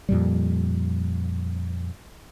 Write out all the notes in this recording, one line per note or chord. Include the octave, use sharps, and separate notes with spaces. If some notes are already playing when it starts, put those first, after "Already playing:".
F2 A#2 G3